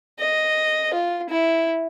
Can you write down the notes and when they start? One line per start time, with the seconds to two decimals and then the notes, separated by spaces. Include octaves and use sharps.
0.20 D#5
0.93 F4
1.30 E4